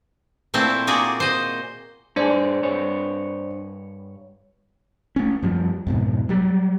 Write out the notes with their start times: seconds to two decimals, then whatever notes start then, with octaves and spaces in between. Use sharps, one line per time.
0.54 A#2 A3 C4 E4 C5
0.87 A#3 F#4 G#4 D5
1.20 C5 D#5
2.16 G2 D4 G#4 C5 D5
2.62 G2 C#5
5.16 A3 C#4
5.43 F#2 F3 G3
5.87 F2 G#2 B2
6.29 F#3 G3